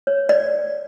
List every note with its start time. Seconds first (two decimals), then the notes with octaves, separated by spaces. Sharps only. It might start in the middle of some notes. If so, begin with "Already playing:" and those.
0.07 C#5
0.29 D5